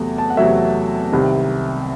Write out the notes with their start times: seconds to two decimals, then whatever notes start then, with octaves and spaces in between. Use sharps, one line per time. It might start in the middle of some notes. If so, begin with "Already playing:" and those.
Already playing: E2 C3 F#3 A3
0.18 A5
0.30 F#5
0.37 E2 C3 F#3 A3 E5
1.12 C2 C3 D#3